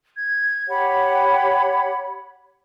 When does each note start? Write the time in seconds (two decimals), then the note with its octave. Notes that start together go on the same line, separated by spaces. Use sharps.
0.14 G#6
0.68 G4 C#5 F#5 B5